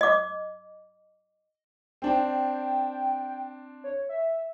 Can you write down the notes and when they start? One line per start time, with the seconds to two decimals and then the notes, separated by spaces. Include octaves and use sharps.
0.01 D#5 D6
2.02 C4 D4 G5
3.84 C#5
4.09 E5